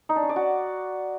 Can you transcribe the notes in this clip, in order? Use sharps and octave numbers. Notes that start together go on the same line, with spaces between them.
D#4
D4
C#4
D5
F#4